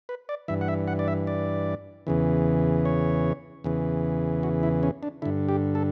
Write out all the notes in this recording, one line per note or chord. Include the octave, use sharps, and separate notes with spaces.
B4
D5
G2 E3 E5
F#5
E5
F#5
D5
E5
D5
E2 C#3 E3
C#5
E2 C#3 E3
F#4
E4
C#4
D4
G2 D3 E4
G4
A4